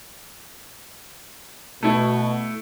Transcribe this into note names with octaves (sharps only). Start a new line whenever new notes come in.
B2 A3 E4